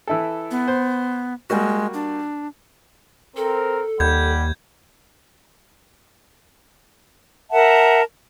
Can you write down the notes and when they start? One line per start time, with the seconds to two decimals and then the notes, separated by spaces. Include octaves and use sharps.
0.07 E3 E4 A4
0.51 B3
0.68 C5
1.50 G3 G#3 A#3 F#4
1.94 D4
3.37 C4 A4 A#4
4.00 D#2 G3 F#5 B5 G6 G#6
7.51 A#4 E5 F#5 A5